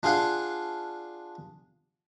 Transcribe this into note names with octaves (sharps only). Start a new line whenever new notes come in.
D4 F4 G#4 F5 F#5